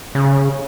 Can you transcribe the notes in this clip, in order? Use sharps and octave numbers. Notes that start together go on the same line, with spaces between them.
C#3